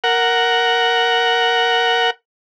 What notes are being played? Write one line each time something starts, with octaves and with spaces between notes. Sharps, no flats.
A#4 F#5